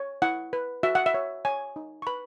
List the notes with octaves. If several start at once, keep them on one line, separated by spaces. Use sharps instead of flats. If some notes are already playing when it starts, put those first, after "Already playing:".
Already playing: C#5
E4 F#5
B4
F#4 E5
F#5
E5
C#5
C#5 G#5
D#4
C#6
B4 B5